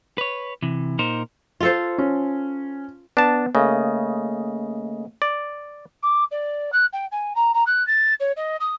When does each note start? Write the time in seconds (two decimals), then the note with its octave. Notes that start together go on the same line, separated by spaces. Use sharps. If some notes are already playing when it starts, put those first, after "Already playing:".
0.18 B4 C#5
0.62 C3 E3
0.99 A#2 D#4 A#4 C5
1.60 F4 A4 C5
1.98 C#4
3.17 B3 D4 A5
3.55 C#3 A3 A#3 D#5
5.22 D5
6.03 D6
6.31 D5
6.73 F#6
6.93 G5
7.12 G#5
7.36 A#5
7.54 A#5
7.67 F#6
7.87 A6
8.20 C#5
8.37 D#5
8.60 D#6